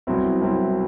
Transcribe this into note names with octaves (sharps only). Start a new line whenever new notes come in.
C2 B2 F#3 C4 E4
C2 B2 F#3 C4 E4